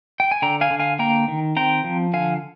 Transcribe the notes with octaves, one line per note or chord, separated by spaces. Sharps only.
G5
G#5
D3 G5 A#5
F5 G#5
D3
F5 G#5
A#3 G5 A#5
D#3
C4 G5 A#5
F3
D3 F5 G#5